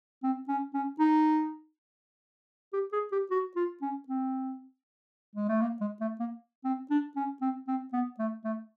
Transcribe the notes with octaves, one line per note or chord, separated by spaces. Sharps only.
C4
C#4
C#4
D#4
G4
G#4
G4
F#4
F4
C#4
C4
G#3
A3
A#3
G#3
A3
A#3
C4
D4
C#4
C4
C4
B3
A3
A3